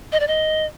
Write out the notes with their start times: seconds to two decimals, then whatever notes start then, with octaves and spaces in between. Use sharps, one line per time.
0.12 D#5
0.20 D5
0.27 D#5